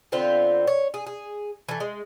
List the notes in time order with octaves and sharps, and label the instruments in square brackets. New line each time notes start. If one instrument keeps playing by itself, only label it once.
[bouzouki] D3 B3 C4 F4
C#5
G#4
G#4
E3 A3
G#3